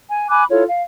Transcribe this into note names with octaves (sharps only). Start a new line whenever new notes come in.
G#5
G#5 B5 D6 F#6
E4 F4 A4 C#5
F5